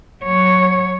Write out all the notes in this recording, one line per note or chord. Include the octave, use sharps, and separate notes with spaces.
F#3 C#5